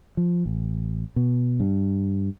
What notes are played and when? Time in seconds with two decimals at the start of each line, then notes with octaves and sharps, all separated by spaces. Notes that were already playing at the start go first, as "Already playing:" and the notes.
0.17 F3
0.46 A1
1.16 B2
1.60 G2